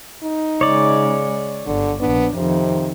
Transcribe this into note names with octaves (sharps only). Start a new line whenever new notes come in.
D#4
C#3 G#3 C#5 D5
G1 D3
A#1 B3 D4
F2 C3 D#3